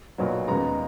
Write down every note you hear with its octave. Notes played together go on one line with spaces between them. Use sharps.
B1 A#2 F#3 B3
D#2 C#3 G#3 B3 A#5